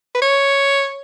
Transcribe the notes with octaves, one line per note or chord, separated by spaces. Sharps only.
B4
C#5